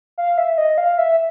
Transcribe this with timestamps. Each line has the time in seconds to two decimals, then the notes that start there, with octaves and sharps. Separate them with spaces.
0.18 F5
0.38 E5
0.58 D#5
0.78 F5
0.98 E5